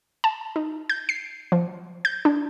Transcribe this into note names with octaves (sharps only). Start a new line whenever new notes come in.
A5
D#4
G6
C7
F3
G6
D4